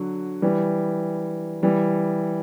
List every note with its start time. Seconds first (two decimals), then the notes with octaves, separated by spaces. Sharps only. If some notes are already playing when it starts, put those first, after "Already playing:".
Already playing: D3 F#3
0.42 E3 G3
1.63 E3 G3